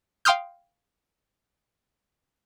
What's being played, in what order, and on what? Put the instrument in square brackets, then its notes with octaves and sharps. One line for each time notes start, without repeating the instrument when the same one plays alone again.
[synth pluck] F5 G5 C6 D#6 F6 G6